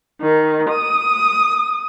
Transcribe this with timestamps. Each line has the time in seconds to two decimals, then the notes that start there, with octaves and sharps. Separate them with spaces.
0.21 D#3
0.70 D#6